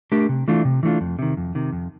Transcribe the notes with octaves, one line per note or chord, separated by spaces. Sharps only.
A3 D4 G4 A#4
C3
E3 A3 D4 F4
C3
E3 A3 D4 F4
F2
C3 D#3
F2
C3 D#3
F2